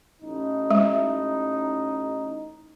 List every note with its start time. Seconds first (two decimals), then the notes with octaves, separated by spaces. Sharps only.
0.22 A1 D#4
0.71 G#3